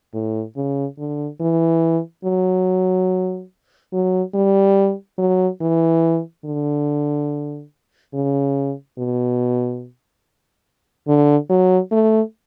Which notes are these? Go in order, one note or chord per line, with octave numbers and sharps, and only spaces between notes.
A2
C#3
D3
E3
F#3
F#3
G3
F#3
E3
D3
C#3
B2
D3
F#3
A3